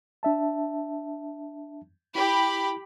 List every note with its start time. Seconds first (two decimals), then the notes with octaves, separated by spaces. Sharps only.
0.23 D4 E5 A5
2.15 E4 G4 B5